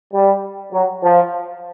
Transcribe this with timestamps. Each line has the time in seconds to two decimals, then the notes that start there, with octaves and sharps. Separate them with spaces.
0.14 G3
0.72 F#3
1.03 F3